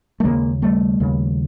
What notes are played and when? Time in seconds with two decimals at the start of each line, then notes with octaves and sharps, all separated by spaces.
0.20 A3
0.24 D#2 C#3 G#3 A#3
0.62 G3 A3
1.00 D#2 C#3